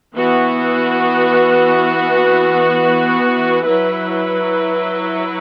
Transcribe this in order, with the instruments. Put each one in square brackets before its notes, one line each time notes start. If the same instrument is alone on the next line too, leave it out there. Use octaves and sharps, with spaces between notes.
[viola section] E3 B3 F#4
F#3 E4 B4